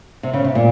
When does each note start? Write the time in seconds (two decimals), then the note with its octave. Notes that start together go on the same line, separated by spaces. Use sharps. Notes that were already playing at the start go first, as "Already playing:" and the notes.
0.23 C3
0.33 C#3
0.45 C3
0.55 A#2